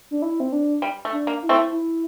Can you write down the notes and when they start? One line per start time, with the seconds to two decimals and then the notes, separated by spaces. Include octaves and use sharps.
0.11 D4
0.22 E4
0.40 C4
0.52 D4
0.82 G3
1.05 A3
1.12 D4
1.27 A#3
1.43 E4
1.49 A3 C4
1.72 E4